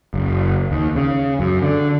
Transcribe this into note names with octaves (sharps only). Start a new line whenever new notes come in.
F#1
D#2
C#3
F#2
D3